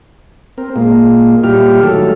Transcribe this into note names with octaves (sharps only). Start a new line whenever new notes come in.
C4 A#4
A#2 G#3 A#3
A#2 G3 E4 G4 F6
D#3 F#3 A3 A4